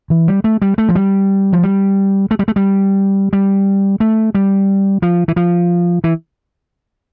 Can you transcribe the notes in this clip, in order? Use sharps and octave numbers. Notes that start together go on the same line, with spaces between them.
E3
G3
A3
G3
A3
F3
G3
F3
G3
A3
G3
A3
G3
G3
A3
G3
F3
E3
F3
E3